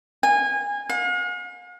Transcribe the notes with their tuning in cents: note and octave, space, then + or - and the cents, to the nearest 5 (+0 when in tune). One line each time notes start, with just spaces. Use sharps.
G#5 -25
F5 +45